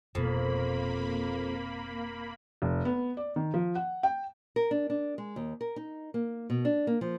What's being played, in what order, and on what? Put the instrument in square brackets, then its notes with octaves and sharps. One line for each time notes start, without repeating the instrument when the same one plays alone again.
[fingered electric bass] F1 B2 [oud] F2 [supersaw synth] A#3 B5
[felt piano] F1
B3
D5
D#3
F3
F#5
G5
[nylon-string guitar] A#4
D4
D4
G#3
D#2
A#4
D#4
A#3
B2
D4
A#3
F3